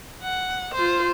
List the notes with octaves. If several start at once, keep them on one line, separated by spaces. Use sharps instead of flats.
F#5
F4 C5